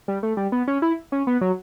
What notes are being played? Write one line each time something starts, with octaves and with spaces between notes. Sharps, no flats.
G3
A3
G3
B3
C#4
E4
C#4
B3
F#3